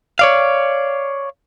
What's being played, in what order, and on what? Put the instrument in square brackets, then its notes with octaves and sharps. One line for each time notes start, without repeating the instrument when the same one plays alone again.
[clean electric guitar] C#5 D5 F5